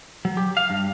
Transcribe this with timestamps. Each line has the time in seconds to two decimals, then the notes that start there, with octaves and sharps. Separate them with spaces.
0.25 F#3
0.37 G4
0.57 F5
0.70 G2